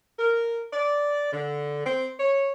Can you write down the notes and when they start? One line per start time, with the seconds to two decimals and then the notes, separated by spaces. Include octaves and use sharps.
0.19 A#4
0.73 D5
1.33 D3
1.85 C4
2.20 C#5